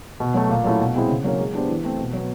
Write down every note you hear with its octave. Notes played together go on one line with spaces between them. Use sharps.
B2
F#3 A3
A#2
F#3 A3 C#4 E4
B2
G#3 C4 E4
C#3
F#3 A#3 C#4
G#3
B3 D4 G4 C5
E3
A3 C4
B2
F#3 B3